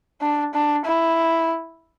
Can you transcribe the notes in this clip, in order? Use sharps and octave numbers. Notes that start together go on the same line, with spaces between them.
D4
D4
E4